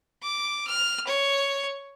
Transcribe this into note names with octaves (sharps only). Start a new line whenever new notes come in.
D6
F6
C#5